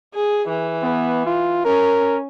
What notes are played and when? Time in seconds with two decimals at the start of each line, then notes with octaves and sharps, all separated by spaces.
0.14 G#4
0.48 E3
0.83 B3
1.26 F4
1.65 C#4 A#4